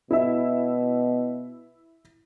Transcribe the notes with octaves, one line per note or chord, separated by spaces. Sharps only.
B2 E4 E5